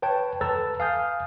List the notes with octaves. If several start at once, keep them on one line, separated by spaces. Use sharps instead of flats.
B4 C#5 G5 A5
A4 B4 A5 A#5 E6 A6
F5 G#5 D#6 F6 G6